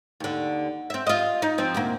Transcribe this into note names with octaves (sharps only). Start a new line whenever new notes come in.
D#2 D3
C4 E5
F4 D#5
D#4
F3 C4
D2 A#2 A#3